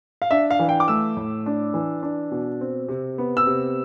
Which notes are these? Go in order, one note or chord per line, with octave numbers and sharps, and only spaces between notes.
F5
D4 E5
F5
E3
G5
D6
A3 E6
A2
D4
E3
D4
B2
C4
C3
B3
E6
C3